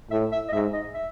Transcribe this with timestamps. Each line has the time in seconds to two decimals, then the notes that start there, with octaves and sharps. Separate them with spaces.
0.11 A2 E5
0.32 E5
0.49 D#5
0.53 G#2 E5
0.73 D#5
0.94 E5